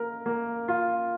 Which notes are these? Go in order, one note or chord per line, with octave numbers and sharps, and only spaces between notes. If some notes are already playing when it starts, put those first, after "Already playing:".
Already playing: A#3 A#4
A#3
F4